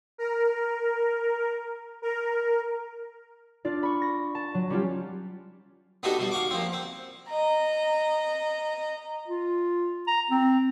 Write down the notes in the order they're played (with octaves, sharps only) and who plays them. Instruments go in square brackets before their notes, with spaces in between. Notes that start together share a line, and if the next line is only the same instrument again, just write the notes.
[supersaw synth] A#4
A#4
[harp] D4 F4 D5
B5 C#6
A#6
A5
F#3
G3 C#4 F4 G4
[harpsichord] B3 D4 D#4 F#4 G4 A4
B2 G3
F5 F#5 C#6 D6
A#2 F3 C4
C4
[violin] D#5 A#5
[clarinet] F4
A#5
C4